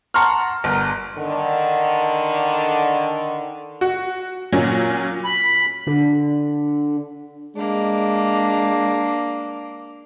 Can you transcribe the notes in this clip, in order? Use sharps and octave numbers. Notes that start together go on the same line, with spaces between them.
F#5 A5 A#5 C6 C#6 F6
G1 A#4
D3 D#3
F#4
A#2 F#3 C#4
B5
D3
G#3 A#3 D4